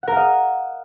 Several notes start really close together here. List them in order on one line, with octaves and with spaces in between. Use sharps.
F#5 A#4 F5 D#5